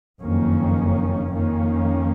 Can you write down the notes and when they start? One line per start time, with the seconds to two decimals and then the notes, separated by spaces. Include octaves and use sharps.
0.20 F#1 F2 D#3 A#3 C#4
1.30 F2 D#3 A#3 C#4